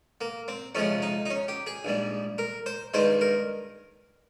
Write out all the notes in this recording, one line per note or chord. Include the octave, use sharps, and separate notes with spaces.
A#3
C4
F2 C3 F3 G#3 C#4
D#4
D#4
C#4
G4
G#4
A#1 G#2 G3
A#4
C5
G2 D#3 G#3 C5
A#4